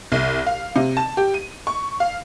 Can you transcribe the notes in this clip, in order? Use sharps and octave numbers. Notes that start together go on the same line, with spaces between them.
C2
F5
C3
A5
G4
D#7
C#6
F5